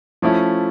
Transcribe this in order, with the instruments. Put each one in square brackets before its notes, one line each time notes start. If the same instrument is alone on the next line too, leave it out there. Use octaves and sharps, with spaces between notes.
[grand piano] F3 A3 C#4 E4